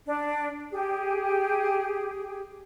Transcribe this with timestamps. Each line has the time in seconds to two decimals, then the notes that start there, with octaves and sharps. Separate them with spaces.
0.06 D4
0.71 G4 G#4